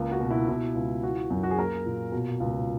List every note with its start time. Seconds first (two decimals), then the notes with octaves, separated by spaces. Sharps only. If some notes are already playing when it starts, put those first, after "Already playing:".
Already playing: C#2 A#3
0.11 F#4
0.21 B2
0.30 E4
0.48 B2 E4
0.75 C#2
1.03 E3 F#4
1.31 F#2
1.43 F#4
1.51 G#4
1.58 A#3 A#4
1.86 A#2
2.12 B2
2.40 C#2